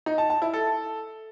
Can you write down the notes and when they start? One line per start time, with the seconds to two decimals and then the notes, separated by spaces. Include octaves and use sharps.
0.06 D#4
0.18 A5
0.30 A5
0.42 E4
0.54 A4